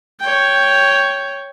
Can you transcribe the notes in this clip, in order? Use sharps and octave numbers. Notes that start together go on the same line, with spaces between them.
C#5 G5